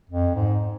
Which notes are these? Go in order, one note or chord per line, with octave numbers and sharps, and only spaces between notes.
F2
G#2